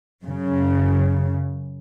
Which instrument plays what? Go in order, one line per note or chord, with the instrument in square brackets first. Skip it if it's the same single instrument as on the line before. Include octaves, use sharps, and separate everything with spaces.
[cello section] F#2 C#3